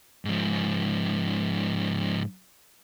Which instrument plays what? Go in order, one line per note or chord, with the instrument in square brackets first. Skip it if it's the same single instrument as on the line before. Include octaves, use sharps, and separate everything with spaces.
[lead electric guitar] G#2 F3